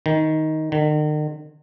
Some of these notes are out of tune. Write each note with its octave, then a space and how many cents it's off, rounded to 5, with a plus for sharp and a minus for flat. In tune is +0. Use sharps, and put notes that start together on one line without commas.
D#3 +10
D#3 -45